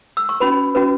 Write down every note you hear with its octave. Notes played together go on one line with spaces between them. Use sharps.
E6
C#6
C#4 F#4 B4 B5
C#4 F#4 B4